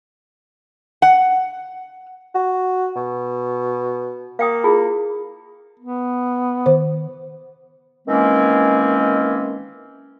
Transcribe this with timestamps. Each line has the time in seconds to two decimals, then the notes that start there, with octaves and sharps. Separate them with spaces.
1.02 F#5
2.35 F#4
2.96 B2
4.39 A#3 F5 G5 D#6
4.64 E4 F4 G#4
5.79 B3
6.66 D#3 C5
8.08 D#3 E3 G#3 A#3 C4 C#4